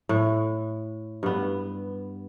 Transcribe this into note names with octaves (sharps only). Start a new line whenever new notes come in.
A2
G2 B3